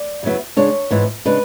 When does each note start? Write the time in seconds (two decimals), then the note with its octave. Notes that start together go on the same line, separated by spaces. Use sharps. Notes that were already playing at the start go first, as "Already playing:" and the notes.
Already playing: D5
0.23 F#2 C#3 F#3 B3 E4
0.57 C#3 G#3 D4 C#5
0.91 G#2 E3 B3 E4
1.25 C#3 G#3 D4 B4